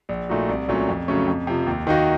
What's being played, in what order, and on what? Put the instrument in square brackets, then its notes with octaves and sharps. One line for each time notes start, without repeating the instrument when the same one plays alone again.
[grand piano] A#1
A#2 A3 D#4 F#4
C2
A#2 F#3 A3 C#4
F2
C#3 F#3 A3 C#4
F2
C3 F3
D#2
D#3 A#3 D#4 F#4